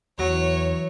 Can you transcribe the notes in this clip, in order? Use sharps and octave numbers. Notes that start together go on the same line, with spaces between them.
E2 E3 F#3 C#5